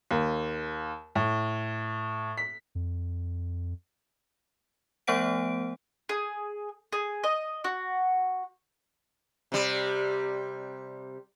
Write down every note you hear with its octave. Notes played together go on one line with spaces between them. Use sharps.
D#2
A2
B6
F2
F3 A3 B3 C5 F#5 D7
G#4
G#4
D#5
F#4
C3 G3